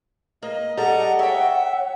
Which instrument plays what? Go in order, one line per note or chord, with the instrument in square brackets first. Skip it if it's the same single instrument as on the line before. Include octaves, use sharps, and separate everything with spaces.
[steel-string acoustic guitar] A#3 [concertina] D#5
[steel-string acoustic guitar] G3 A4 [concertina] D#5 A#5 [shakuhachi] F#5
[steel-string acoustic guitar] C#5 G5 [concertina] E5